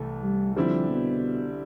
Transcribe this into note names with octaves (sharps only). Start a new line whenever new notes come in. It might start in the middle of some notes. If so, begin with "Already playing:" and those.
Already playing: C2 C3 E3 A3
G3
D3 F3 G3 C4 E4 G4
B2